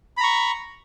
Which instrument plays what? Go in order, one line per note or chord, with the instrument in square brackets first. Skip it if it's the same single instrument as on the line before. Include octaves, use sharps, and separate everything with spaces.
[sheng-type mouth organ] B5
A#5
C#6